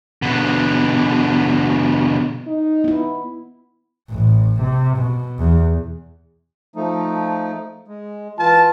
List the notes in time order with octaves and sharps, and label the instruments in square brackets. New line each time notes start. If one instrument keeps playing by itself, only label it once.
[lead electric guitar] B2 D3
[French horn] D#4
[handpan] B3 E4
[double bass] A1
C3
B2
E2
[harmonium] F3 A3 D#4
G#3
[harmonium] E3 F4 [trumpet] A5